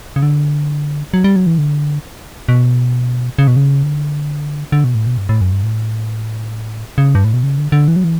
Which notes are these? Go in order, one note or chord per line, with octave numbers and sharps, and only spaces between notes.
C#3
D3
F#3
G3
F#3
E3
D3
B2
C#3
B2
C#3
D3
D3
B2
A2
B2
G2
A2
F#2
G2
A2
C#3
G2
A2
B2
C#3
D3
D3
E3
F#3
E3